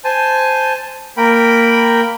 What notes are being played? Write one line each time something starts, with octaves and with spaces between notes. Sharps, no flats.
C5 G#5 A5
A#3 A#4 G5 B5